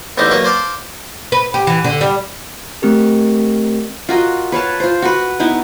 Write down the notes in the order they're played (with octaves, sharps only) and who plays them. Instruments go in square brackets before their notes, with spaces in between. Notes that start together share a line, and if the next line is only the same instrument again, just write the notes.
[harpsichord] A1 E2 D#4 G4 C5
F#3 A#3 B4
C5 D5 F5 A5
[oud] B4
G4
E3
D3
G3
[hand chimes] A3 C4 G4 A#4
[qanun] F4 F#4 A#4 D#5
B4 C#5 F5 A5
F4 C5
F#4 B4
B3 D#4 E4